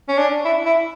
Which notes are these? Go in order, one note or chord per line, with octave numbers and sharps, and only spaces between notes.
C#4
D4
E4
E4